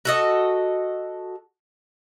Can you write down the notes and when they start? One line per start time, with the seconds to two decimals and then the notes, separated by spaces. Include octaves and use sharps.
0.05 F#4 A4 D#5